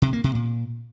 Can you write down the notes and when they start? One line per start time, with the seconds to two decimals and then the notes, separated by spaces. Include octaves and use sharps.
0.02 C3
0.13 A#3
0.24 C3
0.35 A#2